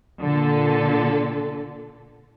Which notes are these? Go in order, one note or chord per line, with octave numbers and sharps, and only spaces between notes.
A#2 D3 A4